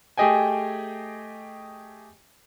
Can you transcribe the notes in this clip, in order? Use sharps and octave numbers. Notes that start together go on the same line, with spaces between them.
A3 G4 G#4 D#5 G5 G#5